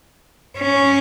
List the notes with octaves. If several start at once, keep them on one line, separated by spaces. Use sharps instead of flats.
C#4